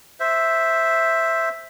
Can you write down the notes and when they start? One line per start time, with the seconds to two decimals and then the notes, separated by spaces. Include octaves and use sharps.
0.20 C5 E5